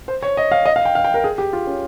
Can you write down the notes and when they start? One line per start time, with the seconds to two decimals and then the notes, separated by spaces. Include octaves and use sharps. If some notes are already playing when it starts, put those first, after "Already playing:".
0.08 C5
0.23 C#5
0.37 D#5
0.51 F5
0.66 D#5
0.76 F5
0.85 G5
0.95 F5
1.05 G5
1.14 A#4
1.24 G#4
1.38 G4
1.53 F4
1.67 C#4